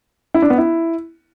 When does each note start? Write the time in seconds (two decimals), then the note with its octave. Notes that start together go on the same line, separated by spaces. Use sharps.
0.34 E4
0.42 D4
0.50 B3
0.58 E4